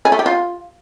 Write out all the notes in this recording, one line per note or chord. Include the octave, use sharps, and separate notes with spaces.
G#4
A3
G4
F4